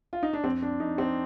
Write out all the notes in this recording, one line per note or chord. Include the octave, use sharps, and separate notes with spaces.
F4
D#4
D4
F2 C4
D4
F2 D#4
C4